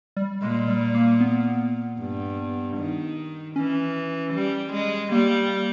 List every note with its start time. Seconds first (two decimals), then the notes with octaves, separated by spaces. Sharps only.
0.17 G3
0.42 A#2 G#3
0.68 G3
0.95 A#3
1.20 B3
1.99 G2
2.77 D#3
3.56 E3 C#4
4.34 G3
4.72 G#3
5.12 G3 A#3